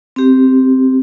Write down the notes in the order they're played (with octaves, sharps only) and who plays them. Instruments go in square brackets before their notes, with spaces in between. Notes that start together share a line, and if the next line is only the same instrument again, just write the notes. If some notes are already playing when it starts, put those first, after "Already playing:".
[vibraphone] C4 G4